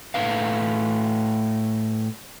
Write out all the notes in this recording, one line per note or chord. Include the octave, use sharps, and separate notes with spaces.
A2 A3 B4 F5